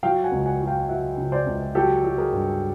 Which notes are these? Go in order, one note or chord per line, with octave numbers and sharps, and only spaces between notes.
F#3 F5 G5
F#5 G#5
C#2
F#5 G#5
F#3
F5 G5
F#3 E5 F#5
C#3
C5 D5
C#2
F#3 G4 A4
F#3
G#4 A#4
G2